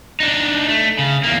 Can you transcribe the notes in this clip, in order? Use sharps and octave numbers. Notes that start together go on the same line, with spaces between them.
D4 D#4
A3
C#3
E2 A#3